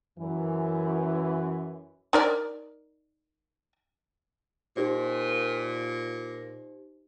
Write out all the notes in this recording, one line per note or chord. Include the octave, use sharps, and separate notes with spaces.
F#2 E3
D#4 A#4 D5
A#2 D#4 G4 C5